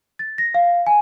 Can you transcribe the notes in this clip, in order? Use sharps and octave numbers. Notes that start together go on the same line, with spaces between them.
A6
A#6
F5
G#5